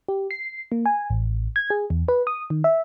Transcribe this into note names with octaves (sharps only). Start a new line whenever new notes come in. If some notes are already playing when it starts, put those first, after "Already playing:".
G4
C7
A#3
G#5
A1
G#6
G#4
E2
B4
D#6
D#3
E5